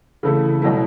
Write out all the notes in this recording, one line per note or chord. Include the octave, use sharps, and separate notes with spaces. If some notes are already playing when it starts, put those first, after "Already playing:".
C#3 E3 A3 E4 A4
B2 F#3 A3 E4